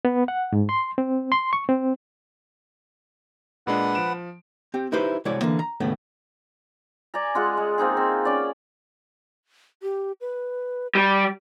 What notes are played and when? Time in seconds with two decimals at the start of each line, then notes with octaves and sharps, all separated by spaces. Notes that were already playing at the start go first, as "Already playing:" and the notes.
0.05 B3
0.28 F#5
0.52 G#2
0.69 C6
0.98 C4
1.32 C6
1.53 C#6
1.69 C4
3.67 A#2 G#3 D4 B4 F#5
3.95 F3 D7 E7
4.74 C4 G4
4.92 D#4 E4 G4 B4 C5
5.25 C2 G#3 E4 F#4 C#5 D5
5.41 D3 E3 A#3
5.59 A#5
5.80 D#2 A2 C#3 A3 B3
7.14 D5 G#5 A#5
7.35 G#3 F4 G#4 F#5
7.57 G#3
7.78 A#3 C4 D#4 G#4
7.97 C4
8.25 C#4 D5
9.82 G4
10.21 B4
10.95 G3 D6